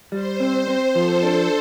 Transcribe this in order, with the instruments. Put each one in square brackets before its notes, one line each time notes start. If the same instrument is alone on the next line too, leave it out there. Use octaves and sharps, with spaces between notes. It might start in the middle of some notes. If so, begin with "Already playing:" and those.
[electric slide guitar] G3 [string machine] C5
[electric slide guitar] C4
C4
[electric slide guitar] F3 [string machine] A4
[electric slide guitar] D4